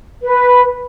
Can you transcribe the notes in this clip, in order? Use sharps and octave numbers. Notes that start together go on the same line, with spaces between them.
B4